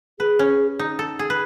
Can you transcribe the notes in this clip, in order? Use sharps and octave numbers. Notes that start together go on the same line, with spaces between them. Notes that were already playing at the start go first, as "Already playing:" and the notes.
G#4 B4
C#4
D#4
A4
G#4
B4